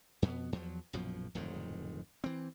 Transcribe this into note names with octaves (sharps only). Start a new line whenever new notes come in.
F2 B2 B3
E2 F3 F#3
A#1 F#2 B2 F3
D1 F2 G#2 D#3
E3 C4